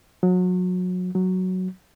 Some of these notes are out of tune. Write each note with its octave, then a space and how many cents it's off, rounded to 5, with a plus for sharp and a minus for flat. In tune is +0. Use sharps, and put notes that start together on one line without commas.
F#3 -30
F#3 +0